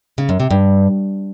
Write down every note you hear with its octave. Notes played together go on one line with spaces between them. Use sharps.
C#3
F#2
C3
G2